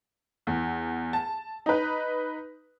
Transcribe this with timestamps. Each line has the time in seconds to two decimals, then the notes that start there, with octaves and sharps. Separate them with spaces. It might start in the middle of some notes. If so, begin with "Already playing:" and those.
0.47 E2
1.13 A5
1.66 D#4 B4